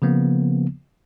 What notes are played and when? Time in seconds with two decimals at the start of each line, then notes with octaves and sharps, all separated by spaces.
0.02 C#3 F3 A#3 B3